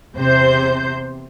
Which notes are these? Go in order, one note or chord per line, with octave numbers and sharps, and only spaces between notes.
E2 C3 C5 G6